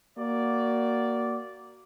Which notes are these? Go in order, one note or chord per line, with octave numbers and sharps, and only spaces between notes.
A#3 F#4 D5